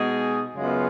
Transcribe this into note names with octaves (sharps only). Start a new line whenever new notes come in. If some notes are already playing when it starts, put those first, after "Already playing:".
Already playing: B2 G#3 D#4 G#4
F#2 C#3 G#3 B3 F4